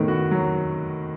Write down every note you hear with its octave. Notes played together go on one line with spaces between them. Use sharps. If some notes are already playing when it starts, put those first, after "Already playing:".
Already playing: A2 D#3 B3
F#4
F#3